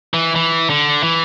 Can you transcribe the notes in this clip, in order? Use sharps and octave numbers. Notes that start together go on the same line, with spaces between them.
E3
E3
D3
E3